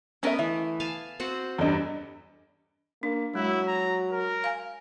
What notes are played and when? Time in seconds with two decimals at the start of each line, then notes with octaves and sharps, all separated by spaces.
0.23 A3 B3 C#4 A#4 D#5 E5
0.39 E3 E5
0.80 F5 G#5 A5
1.20 C4 F#4 F#5
1.58 E2 G2 A4 D#5
3.03 A#3 D4
3.35 F#3 G#3 E4
3.68 A#5
4.11 A#4
4.44 F5 G#5